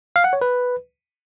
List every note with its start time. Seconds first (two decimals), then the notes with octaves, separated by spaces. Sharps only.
0.16 F5
0.24 F#5
0.33 C#5
0.41 B4